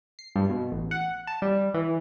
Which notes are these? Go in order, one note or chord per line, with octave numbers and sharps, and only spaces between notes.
C7
G2
B2
A1
F#5
A5
G3
E3